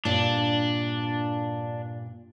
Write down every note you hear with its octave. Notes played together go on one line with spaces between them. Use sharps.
G2 A#2 D4